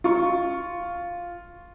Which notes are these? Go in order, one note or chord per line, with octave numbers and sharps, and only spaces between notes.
F4 C#6